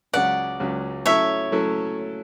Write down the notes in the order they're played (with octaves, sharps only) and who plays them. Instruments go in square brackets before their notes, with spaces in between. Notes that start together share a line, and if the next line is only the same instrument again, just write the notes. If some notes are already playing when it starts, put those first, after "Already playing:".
[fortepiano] C#2 C#3 F#3 C#4 [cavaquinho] D5 F#5
[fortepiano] C#2 C#3 F#3 C#4
[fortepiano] F#3 A3 C#4 E4 A4 [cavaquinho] C#5 E5
[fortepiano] F#3 A3 C#4 E4 A4